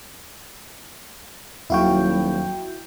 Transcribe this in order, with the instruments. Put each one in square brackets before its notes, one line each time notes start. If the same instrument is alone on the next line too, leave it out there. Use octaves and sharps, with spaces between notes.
[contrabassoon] D#1 [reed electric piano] D#2 F5 C#6 [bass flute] F#3 [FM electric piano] E4 F#4 G5